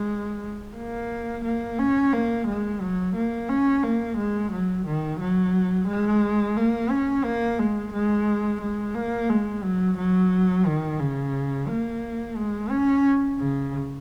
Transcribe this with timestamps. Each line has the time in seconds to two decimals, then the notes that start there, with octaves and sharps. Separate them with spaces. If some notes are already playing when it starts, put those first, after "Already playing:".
Already playing: G#3
0.76 A#3
1.44 A#3
1.79 C#4
2.13 A#3
2.47 G#3
2.81 F#3
3.15 A#3
3.49 C#4
3.83 A#3
4.17 G#3
4.52 F#3
4.86 D#3
5.20 F#3
5.88 G#3
6.57 A#3
6.90 C#4
7.24 A#3
7.59 G#3
7.93 G#3
8.61 G#3
8.95 A#3
9.29 G#3
9.64 F#3
9.97 F#3
10.66 D#3
10.99 C#3
11.68 A#3
12.37 G#3
12.70 C#4
13.38 C#3